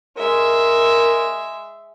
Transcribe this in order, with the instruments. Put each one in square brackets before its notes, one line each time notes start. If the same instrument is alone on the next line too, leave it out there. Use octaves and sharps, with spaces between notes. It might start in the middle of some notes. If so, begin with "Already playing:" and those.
[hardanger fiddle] G#3 E5 [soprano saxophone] A#4